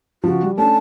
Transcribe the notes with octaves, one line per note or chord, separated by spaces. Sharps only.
C#3 F3 F#4
G3
A3 C#4 D4 A5